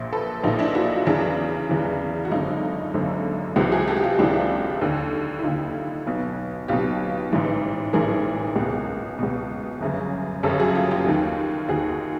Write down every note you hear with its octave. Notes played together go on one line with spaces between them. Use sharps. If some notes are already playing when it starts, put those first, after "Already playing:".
Already playing: A#1 A#2
A4 B4
A#1 A#2 D#4 F4
D4 E4
E4 F#4
F4
E2 C#3 E3 D4 E4
E2 C#3 E3
F#4
G#1 F#2 D3 D#4 F4
G#1 F#2 D3
C#2 C3 E3 E4 F#4
F#4 G#4
G4 A4
F#4
F4 G4
C#2 C3 E3 D4 E4
D#2 D3
E4
D#2 D3 D#4 F4
B1 B2
B1 B2 F4 G4
A1 G#2 E3
A1 G#2 E3 G#4 A#4
C#2 B2
C#2 B2
G1 F#2 C#3
G1 F#2 C#3 G4 A4
F#4 G#4
F4 G4
F4 G4
D#2 D#3
D#2 D#3 F#4 G#4